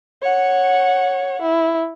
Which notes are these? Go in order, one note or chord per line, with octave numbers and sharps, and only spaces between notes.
C#5 F#5
E4